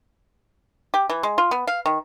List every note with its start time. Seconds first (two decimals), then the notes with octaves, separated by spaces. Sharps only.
0.94 G4
1.10 E3
1.23 G#3
1.38 F4
1.51 B3
1.67 F5
1.86 D#3